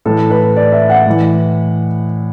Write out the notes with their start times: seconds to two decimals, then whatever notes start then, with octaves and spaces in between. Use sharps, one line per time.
0.05 A2 E3 A4
0.30 B4
0.56 D5
0.72 E5
0.90 F#5
1.06 A2 E3